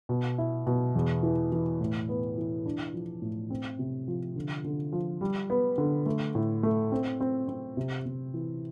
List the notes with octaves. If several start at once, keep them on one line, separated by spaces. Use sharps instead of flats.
B2
E4
B2
E2
E3
E3
A2
B3
E3
D4
F3
A2
C4
C3
F3
D3
D3
F3
G3
B3
D3
A3
A2
A3
C4
C4
C4
C3
C3
E3